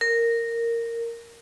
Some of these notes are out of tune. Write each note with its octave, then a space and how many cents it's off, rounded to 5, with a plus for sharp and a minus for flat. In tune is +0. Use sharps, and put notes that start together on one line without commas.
A#4 -10